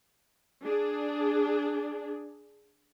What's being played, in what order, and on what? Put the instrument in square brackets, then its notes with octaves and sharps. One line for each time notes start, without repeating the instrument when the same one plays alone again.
[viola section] D4 G#4